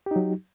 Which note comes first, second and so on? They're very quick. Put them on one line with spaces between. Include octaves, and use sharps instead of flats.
G4 D#4 F#3